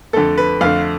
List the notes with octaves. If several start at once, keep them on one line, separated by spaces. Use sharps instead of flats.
F2 D3 A3 A4
B4
F2 D3 A3 F5